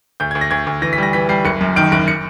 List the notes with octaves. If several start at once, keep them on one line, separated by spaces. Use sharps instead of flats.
D2 G6
G#6
D2
A#6
D2 G#6
D2
E3 A#6
B6
G3 A#6
E3 B6
G3 C7
F#1 C#7
F#2
D#3 D7
F#1 D7
C#7